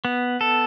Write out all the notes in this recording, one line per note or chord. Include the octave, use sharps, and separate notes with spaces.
B3
A4